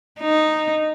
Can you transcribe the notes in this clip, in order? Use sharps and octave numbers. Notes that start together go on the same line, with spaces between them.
D#4